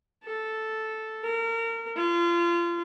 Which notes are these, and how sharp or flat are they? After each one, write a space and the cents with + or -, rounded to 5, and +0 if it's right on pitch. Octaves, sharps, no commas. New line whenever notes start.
A4 -5
A#4 -30
F4 -30